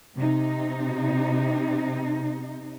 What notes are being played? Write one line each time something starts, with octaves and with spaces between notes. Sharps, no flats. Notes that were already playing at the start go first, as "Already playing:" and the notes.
C3 D#4